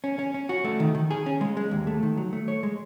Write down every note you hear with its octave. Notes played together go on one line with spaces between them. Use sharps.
C#4
C#4
C#4
F#4
A3
D#3
D#3
G#4
C#4
G#3
G#3
D#2
A3
D#3
F#3
A3
C#5
G#3